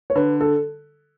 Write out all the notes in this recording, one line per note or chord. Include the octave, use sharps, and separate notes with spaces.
C#5
D3 B4
A4